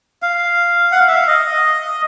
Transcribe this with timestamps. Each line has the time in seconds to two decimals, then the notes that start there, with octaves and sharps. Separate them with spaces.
0.22 F5
0.92 F#5
1.00 F5
1.08 E5
1.15 F5
1.28 D#5